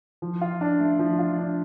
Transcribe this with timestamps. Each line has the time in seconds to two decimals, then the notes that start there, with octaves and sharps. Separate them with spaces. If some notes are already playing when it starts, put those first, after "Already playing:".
0.22 F3
0.41 F4
0.61 D4
0.80 A3
0.99 F3
1.19 F4
1.38 D4